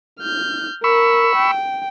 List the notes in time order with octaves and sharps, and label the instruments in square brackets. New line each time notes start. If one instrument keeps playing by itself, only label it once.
[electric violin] F6 G6
[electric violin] A#4 [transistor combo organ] B5 C#6 E6
[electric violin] G5